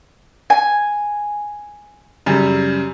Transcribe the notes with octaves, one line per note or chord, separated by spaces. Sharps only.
G#5
F#2 C#3 G3